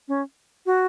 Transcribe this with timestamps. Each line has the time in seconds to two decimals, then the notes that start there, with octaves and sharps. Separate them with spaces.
0.08 C#4
0.66 F#4